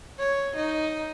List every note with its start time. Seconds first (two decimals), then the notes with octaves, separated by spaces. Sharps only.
0.18 C#5
0.55 D#4